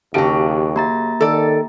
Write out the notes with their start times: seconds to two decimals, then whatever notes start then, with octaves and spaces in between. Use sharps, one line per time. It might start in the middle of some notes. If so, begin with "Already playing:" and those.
0.14 D#2 C#3 F#3 G4 A5 D7
0.76 A#3 A#5 A6
1.20 D#3 A4 D5